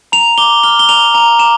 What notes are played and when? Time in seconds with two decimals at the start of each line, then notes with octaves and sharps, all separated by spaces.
0.12 A#5 F7
0.38 D6 G7
0.63 F6 G7
0.79 G7
0.89 A#5 F7
1.14 A#5 F7
1.39 D6 E7